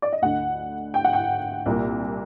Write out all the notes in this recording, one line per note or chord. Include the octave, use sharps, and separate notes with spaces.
D5
D#5
D2 D3 F#5
G5
F#5
G5
C2 A#2